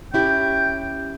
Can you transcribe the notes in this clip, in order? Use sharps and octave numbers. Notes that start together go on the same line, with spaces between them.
C#4 E4 G4 G5